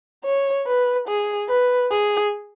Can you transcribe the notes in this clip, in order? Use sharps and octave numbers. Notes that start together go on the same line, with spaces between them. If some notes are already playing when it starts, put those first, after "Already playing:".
C#5
B4
G#4
B4
G#4